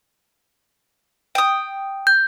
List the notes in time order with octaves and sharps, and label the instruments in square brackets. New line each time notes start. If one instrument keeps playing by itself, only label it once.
[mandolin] G5 D#6
[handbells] G6